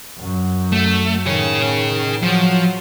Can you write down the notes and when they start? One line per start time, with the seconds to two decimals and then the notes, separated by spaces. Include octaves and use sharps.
0.18 F#2 F#3
0.72 A3
1.26 A2 D#3 G#4 C#5
2.23 F3 F#3